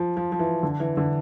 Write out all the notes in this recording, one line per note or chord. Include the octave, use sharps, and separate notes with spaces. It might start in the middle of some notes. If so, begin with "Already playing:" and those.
Already playing: F3
F3
F3
E3
D3
E3
D3